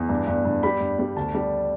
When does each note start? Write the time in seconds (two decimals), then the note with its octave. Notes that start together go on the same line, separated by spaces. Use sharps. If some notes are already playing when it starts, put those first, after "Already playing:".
Already playing: E2
0.09 G2
0.27 G2
0.45 G2
0.63 G3 B5
0.81 G2
0.99 G3
1.17 D2 A5
1.35 G3